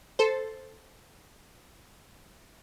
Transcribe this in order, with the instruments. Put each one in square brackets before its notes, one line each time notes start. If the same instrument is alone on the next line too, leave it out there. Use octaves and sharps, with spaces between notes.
[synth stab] A4 C5